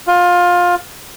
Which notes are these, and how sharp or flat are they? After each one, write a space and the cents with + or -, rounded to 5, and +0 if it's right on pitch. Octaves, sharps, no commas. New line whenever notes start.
F4 +20